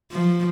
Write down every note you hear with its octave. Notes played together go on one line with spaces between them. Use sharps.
F3